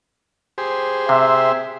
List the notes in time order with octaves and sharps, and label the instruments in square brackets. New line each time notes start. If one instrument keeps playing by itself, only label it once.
[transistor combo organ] G4 G#4 C5
[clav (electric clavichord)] C3 [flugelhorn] E5